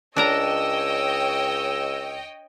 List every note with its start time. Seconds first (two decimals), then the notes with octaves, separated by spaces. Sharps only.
0.16 C#2 D4 A#4 C#5 D#5 G5 A#5 E6